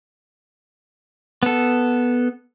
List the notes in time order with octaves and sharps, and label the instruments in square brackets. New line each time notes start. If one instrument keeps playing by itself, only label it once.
[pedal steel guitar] B3 A4